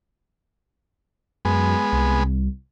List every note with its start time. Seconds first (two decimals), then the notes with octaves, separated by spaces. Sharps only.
1.45 F#2 G#3 B3
1.93 C2